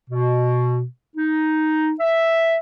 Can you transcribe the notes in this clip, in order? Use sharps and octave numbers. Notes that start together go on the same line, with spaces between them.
B2
D#4
E5